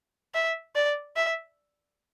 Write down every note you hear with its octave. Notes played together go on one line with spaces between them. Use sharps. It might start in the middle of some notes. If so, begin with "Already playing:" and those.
E5
D5
E5